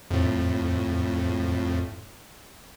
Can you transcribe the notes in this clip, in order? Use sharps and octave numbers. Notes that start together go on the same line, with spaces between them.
F2 A2